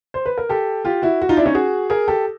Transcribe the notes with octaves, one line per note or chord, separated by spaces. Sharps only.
C5
B4
A#4
G4 A4
F4 G4
E4 F#4
F#4
D#4 F4
D4 E4
C#4 D#4
F#4 G#4
G#4 A#4
G4 A4